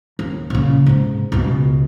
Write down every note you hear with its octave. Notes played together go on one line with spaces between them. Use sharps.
D#2
A#2 C#3
G#2 C3
C#2 B2